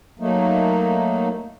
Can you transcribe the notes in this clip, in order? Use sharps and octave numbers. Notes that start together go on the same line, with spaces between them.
F#3 A3 A#3 D#4